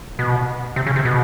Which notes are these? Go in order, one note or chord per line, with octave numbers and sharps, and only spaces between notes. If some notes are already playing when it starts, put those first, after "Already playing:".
B2
C3
C#3
C3
B2